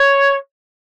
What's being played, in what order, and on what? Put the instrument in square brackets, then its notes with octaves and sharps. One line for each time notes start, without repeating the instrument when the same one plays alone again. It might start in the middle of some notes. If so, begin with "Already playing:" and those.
Already playing: [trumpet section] C#5